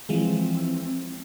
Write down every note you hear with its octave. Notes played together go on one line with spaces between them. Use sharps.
E3 F3 G#3 C4